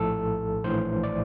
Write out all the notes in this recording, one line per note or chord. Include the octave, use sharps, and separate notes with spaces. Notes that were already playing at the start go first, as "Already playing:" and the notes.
Already playing: A#1 A2 F3 A4
A#1 A2 E3 C5
D5